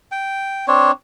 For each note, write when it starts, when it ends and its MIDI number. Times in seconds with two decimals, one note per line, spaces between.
0.12 0.66 79
0.68 0.91 60
0.68 0.91 62
0.68 0.91 73